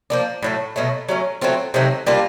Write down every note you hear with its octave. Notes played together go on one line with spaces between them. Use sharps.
F3 A#3 D4
A2 F#3 A3
B2 F#3 A3
F#3 A3 C#4
F#3 A3 C4 F4
C3 D#3 F#3 A3
G3 A#3 D4 F4